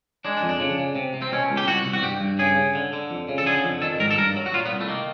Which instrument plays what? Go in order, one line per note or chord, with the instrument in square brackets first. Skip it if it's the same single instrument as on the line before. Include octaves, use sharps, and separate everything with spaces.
[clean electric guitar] G#3 D4
D4
F2
D4
C#3
C#3
C3
C3
C4
B2 C#4
C#2
G4
C2 F#4
C2
F#4
G2 G4
G2
C#3 G#4
C#3
D3
D3
F2
C#3
A4
D3 G#4
F2
D#3 A4
G#2 A#4
A4
G2 A#4
F#3
F#4
A#2 F4
B3
C2
A3
D#3 A#3